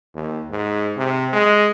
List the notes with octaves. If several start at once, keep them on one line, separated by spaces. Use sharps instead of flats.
D#2
G#2
C3
G#3